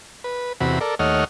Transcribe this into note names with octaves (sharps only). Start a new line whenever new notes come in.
B4
E2 C3 F#4 B5
A4 A#4 D5
D#2 A3 C#5 D#5 F#5 F6